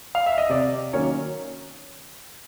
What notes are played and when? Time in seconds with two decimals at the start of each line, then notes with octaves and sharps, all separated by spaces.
0.15 F5
0.26 E5
0.38 D#5
0.49 C3 D5
0.93 D#3 F#3 A#3 C#4 C#5